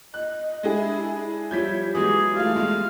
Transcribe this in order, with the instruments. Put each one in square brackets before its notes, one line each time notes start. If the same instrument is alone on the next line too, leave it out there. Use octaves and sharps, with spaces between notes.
[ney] D#5 [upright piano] F#6
[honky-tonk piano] G#3 D4 G#4 [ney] E4
[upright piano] F3 G3 E4 [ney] C#5 [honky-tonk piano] G6 G#6 B6
[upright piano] E3 F#3 G#3 [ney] G4 [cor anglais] G#4
[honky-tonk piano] G3 F4 [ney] A3 [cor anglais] F5
[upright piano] G#3